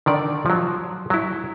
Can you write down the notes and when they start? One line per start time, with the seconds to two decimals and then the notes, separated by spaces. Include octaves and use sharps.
0.06 D3 D#3 D5
0.46 F3 F#3
1.10 F#3 E4